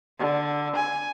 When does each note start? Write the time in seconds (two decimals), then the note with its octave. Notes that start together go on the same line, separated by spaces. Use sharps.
0.19 D3
0.76 G#5